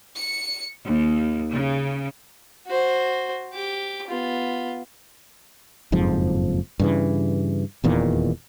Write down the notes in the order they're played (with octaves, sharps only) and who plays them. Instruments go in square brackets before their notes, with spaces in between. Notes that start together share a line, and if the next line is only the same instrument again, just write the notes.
[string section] C#7
D#2
C#3
[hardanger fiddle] F#4 C5
G4 D6
B3 F4
[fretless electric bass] F#1 F2 G#2 F3
G2 C#3 E3
D#1 E2 A#2 D#3